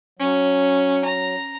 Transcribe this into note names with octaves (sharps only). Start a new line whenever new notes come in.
F#3 C#4
A#5